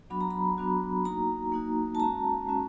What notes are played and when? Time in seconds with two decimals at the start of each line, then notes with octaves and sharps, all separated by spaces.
0.10 F#3 B3 D4 F#4 B5
0.21 A#5
0.31 B5
0.58 F#3 B3 D4 F#4
1.05 A#3 D#4 F#4 A#5
1.52 A#3 D#4 F#4
1.95 A5
2.00 G#3 C#4 F#4 A#5
2.47 G#3 C#4 F#4